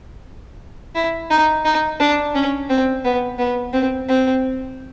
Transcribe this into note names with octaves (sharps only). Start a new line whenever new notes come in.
E4
D#4
D#4
D4
C#4
C4
B3
B3
C4
C4